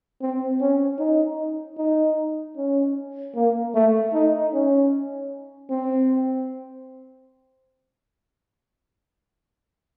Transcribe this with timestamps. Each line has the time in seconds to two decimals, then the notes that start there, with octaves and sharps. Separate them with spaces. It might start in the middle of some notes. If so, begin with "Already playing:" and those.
0.21 C4
0.60 C#4
0.99 D#4
1.77 D#4
2.56 C#4
3.35 A#3
3.74 A3
4.13 D#4
4.53 C#4
5.70 C4